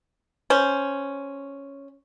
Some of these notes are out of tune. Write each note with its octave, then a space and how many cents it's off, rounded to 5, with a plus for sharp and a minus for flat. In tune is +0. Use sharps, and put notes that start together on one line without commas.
C#4 +0 C5 +0